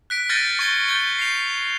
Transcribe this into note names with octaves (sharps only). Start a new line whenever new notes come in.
F#6 B6 D7
F6 G6 A6 A#6 C#7 D#7
C#6 G#6 C#7 G7
G6 A6 G7
C7 F7